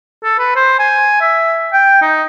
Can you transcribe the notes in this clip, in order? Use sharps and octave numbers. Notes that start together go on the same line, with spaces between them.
A4
B4
C5
G#5
E5
G5
D#4